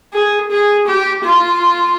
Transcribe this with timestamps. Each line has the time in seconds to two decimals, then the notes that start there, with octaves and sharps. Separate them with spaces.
0.13 G#4
0.51 G#4
0.87 G4
1.24 F4